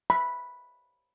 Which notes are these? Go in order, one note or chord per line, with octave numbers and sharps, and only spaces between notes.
B5